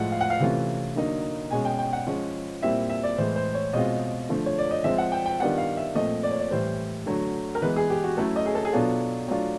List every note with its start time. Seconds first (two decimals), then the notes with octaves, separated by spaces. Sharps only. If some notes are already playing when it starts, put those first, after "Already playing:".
Already playing: A2 F3 G#3 F#5
0.12 F5
0.21 F#5
0.30 F5
0.40 C3 E3 A3 C#4 F4
0.96 D3 F#3 A#3 D#4
1.51 B2 G#3 C#4 G#5
1.65 G5
1.78 G5
1.93 F#5
2.07 F3 G#3 C#4
2.62 A#2 G3 C4 E4 E5
2.90 E5
3.03 D5
3.18 A2 E3 G#3 C5
3.36 C5
3.55 C#5
3.73 B2 G#3 C4 F4 D#5
4.29 D3 F3 A3
4.46 C#5
4.58 D5
4.71 D#5
4.84 F3 G#3 C4 E5
4.98 F#5
5.12 G5
5.26 G5
5.40 D#3 G3 B3 D4 F4 F#5
5.58 F5
5.77 E5
5.95 A#2 F3 A3 C4 D#5
6.23 D5
6.31 C#5
6.40 D5
6.51 A2 E3 G3 C5
7.06 D3 F#3 A3
7.55 A#4
7.62 E3 G#3 B3 B4
7.76 G#4
7.90 G4
8.03 F#4
8.17 F#3 A3 C#4 E4 A4
8.36 D#5
8.46 G#4
8.55 A4
8.65 G#4
8.73 B2 F#3 B3 D4 F4 A4
9.28 F#3 A3 D4 F4